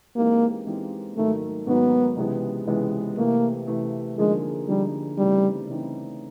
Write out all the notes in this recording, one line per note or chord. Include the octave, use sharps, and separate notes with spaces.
E3 G#3 A#3 C4 D#4 G4
E3 G#3 C4 D#4 G4
G#2 D#3 F#3 A3 A#3 D#4
G#2 D#3 F#3 A#3 B3 D#4
C#2 C3 E3 G#3 B3
C#2 C3 E3 G#3 B3
C3 E3 A3 A#3
C3 E3 A3
D3 F3 G#3 A#3 D#4 G#4
D3 F3 G3 A#3 D#4 G#4
C#3 E3 G3 A3 C4 D#4
C#3 E3 A3 C4 D#4